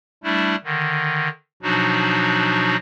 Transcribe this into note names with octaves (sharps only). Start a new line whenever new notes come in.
G3 A3 D4 E4
D3 D#3
B2 F3 F#3 D4 D#4 F#4